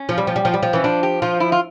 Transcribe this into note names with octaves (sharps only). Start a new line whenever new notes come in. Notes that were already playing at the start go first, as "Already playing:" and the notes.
Already playing: C#4
F3
G3
F3
G3
F3
G3
F3
E3 C#4
F3 D4
G4
F3 F4
E4
F4